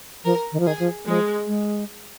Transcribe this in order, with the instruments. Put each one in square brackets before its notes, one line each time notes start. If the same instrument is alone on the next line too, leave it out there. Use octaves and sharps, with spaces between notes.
[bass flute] F3 [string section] A#4
[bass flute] D#3
F3
[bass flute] D#3 [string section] G#4
[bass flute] F3
[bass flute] F3 [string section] G#3
[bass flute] G#3